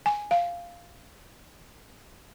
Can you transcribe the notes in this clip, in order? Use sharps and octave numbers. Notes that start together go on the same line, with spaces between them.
G#5
F5